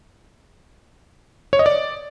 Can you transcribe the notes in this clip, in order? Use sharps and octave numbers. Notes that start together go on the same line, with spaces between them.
C#5
D#5
D5